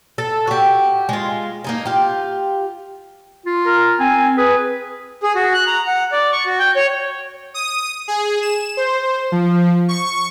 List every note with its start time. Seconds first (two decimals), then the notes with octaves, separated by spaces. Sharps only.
0.18 A4
0.47 F#4 G4
1.09 G#3 F4
1.64 A#3 D#4 G#4
1.85 F4 G4
3.46 F4
3.66 A#4
4.00 C4 G#5
4.37 G#4 B4
5.23 G#4
5.35 F#4
5.54 F#6
5.67 A#5
5.87 F#5
6.12 D5
6.32 C#6
6.46 F#4
6.59 G5
6.76 C#5
7.54 D#6
8.08 G#4
8.42 E7
8.77 C5
9.32 F3
9.88 C#6